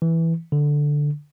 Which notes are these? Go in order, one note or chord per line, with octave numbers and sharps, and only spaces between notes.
E3
D3